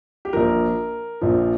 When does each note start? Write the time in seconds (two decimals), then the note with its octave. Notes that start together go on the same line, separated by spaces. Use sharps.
0.25 G4
0.33 A#1 A#2 F3 A#4
1.21 A#1 A#2 F3